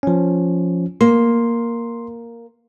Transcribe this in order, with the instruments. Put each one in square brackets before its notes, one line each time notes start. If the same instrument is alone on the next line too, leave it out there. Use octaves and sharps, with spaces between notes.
[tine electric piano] F3 C#4
[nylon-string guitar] A#3 [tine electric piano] C6